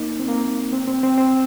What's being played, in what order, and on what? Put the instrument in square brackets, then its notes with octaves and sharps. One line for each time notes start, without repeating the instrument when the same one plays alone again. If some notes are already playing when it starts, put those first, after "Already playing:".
Already playing: [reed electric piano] A#3 D#4
C4
A#3
C4
C4
C4
C4